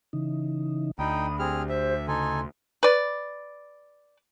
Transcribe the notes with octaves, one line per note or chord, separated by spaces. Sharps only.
C#3 E3 D#4
D2 D#4 G5 B5 D#6
C4 G4 G#4 F6
C5 E5
C#3 D#4 A4 G#5 C6
B4 D5